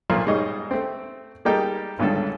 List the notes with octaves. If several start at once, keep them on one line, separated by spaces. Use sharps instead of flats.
B1 A#2 F3 F4 A#4
G#2 G3 C#5 D#5
A3 C4
G3 G#3 A#3 D#4 G4 A4
G#1 C#2 G2 D3 A4